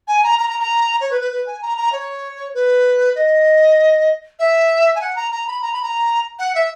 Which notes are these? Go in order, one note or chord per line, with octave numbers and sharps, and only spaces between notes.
G#5
A#5
A#5
A#5
A#5
C#5
B4
B4
B4
G#5
A#5
A#5
C#5
B4
D#5
E5
G#5
F#5
A#5
A#5
B5
A#5
B5
A#5
F#5
E5